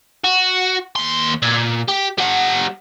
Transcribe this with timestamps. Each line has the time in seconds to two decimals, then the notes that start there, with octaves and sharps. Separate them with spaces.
0.24 F#4
0.96 D#2 C6
1.42 A#2
1.88 G4
2.18 G3 F#5